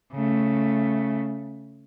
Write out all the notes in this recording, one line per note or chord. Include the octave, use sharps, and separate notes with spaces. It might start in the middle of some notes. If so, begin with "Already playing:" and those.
C#3 A3